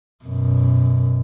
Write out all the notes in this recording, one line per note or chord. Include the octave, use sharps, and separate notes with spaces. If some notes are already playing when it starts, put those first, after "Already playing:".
F#2 B2